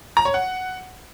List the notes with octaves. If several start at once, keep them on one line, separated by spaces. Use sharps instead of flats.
A#5
C#5
F#5